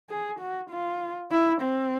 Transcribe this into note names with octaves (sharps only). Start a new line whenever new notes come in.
G#4
F#4
F4
E4
C4